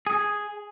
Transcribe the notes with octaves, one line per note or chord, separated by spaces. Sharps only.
G#4